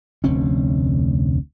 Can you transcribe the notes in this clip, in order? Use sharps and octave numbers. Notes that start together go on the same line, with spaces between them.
F1 D2 C4 C#4